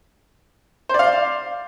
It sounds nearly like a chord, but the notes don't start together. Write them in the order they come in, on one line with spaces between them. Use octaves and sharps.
C5 D5 F5